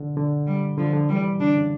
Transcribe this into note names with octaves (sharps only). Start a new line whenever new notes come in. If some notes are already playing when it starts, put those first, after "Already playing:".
Already playing: D3
D3
G3
D3 F3
D3
E3 G3
D3 D4
C#3